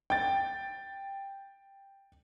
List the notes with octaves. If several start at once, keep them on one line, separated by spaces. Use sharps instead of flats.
G5 A6